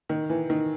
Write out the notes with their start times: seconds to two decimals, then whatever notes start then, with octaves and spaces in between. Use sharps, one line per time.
0.09 D#3
0.29 E3
0.50 D#3